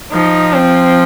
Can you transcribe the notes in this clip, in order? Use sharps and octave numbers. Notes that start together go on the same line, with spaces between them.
F3 D#4
C4